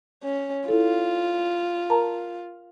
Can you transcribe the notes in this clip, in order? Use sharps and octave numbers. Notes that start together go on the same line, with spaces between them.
C#4
E4 F4 A4
A#4 A5 A#5